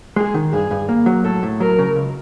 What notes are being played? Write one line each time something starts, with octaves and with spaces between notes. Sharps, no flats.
G#3 G#4
D#3
G2 G#4
G2
A#3
F#3
A2 A4
A2
F#3 A#4
C#3
C#2